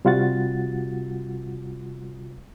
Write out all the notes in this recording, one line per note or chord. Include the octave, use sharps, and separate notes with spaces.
C3 G3 F4 F#4 F#5 A6